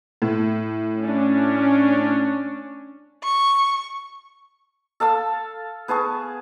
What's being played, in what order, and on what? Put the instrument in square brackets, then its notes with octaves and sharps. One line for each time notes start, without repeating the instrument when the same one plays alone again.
[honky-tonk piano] A2
[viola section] C#4 D4
[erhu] C#6
[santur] A4 F5 A5 E6
B3 G#4 A5 C#6